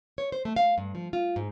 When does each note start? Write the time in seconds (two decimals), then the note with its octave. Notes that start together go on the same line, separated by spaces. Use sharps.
0.18 C#5
0.32 C5
0.45 A3
0.56 F5
0.78 G2
0.95 F3
1.13 F4
1.36 G#2